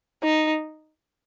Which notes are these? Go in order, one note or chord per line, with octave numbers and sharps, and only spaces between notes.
D#4